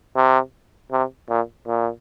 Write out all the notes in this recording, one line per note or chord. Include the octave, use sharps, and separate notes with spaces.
C3
C3
A#2
A#2